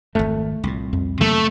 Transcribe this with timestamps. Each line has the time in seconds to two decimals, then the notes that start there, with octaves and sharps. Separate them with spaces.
0.15 G#1 F2 A3
0.64 C2 A#2
0.93 F2
1.21 C3 F#3 A3 A#3